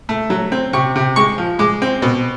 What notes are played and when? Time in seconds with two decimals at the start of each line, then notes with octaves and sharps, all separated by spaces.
0.09 A3
0.30 F#3
0.52 C4
0.73 C3 C#6
0.96 C3
1.16 G#3 C#6
1.38 F3
1.59 G#3 D6
1.82 C4
2.02 B2